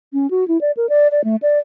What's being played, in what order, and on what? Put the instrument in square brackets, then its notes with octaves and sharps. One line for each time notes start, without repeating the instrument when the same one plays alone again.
[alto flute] C#4
F#4
E4
D5
A#4
D5
D5
A3
D5